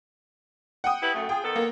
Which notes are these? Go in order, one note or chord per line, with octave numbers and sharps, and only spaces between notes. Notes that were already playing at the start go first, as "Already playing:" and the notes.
F#5 G5 D#6
E4 G4 B4
F#2 A3
F4 G#4 G5
D#3 B3 A4
A#3